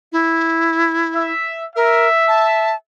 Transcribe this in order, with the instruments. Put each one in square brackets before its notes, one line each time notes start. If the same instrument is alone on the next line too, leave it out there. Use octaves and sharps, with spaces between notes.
[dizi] E4
[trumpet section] E5
[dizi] A#4 [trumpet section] E5
[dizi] A5